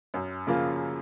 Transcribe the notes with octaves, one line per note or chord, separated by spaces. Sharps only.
F#2
C#3 F3 A#3 F4